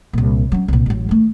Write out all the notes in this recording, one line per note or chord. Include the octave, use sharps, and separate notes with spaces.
C2 A#2
F#3 C#4
C2 A#2
A1 F#3
D#3 A3